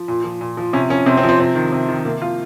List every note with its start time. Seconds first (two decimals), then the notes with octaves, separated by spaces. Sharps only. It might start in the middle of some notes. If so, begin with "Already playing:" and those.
Already playing: F3
0.08 A#2
0.24 F3
0.41 A#2
0.57 F3
0.73 C3 C#4
0.90 F3 C#4
1.06 C3 C4
1.17 C4
1.23 F3
1.29 C4
1.39 C3 C4
1.55 D#3
1.72 C3
1.88 D#3
2.05 C3 A#3
2.22 F3 F4